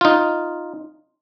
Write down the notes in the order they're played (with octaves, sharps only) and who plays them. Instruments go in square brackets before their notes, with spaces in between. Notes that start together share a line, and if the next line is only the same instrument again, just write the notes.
[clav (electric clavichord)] D#4 F4